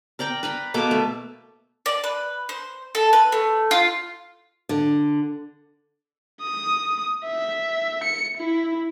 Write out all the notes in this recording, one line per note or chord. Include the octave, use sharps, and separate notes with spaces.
A#4 D5 G5 A#5
B4 A#5 B5
B2 A#3 A4 D6
A3
D5
B4
C5
A4
B4
A3
F4
D3
D#6
E5
C#7
E4